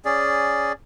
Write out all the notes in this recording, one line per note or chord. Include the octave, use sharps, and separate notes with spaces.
C#4 G#4 D5